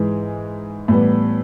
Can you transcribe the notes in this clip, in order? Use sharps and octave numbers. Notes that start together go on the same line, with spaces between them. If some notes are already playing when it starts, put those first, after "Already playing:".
Already playing: G#2 E3 G#3
A2 E3 G3 B3